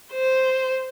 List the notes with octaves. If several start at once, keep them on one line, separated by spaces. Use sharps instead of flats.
C5